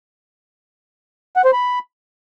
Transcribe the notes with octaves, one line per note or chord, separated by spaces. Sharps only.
F#5
C5
B5